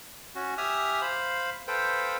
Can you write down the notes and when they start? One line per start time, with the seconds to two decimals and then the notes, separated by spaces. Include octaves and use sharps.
0.35 C#4 F#4
0.58 G4 E5 G#5 D#6 F6
1.02 C5 F5 B5
1.68 A4 B4 C5 F5 G5